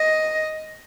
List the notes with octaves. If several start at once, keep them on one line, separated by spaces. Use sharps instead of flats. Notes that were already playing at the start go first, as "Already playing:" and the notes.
Already playing: D#5